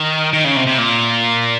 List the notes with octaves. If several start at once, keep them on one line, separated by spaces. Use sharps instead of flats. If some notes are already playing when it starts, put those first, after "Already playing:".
Already playing: D#3
D#3
C#3
C3
C3
A#2